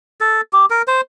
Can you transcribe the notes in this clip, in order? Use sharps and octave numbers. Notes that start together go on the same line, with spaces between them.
A4
G4
A#4
C5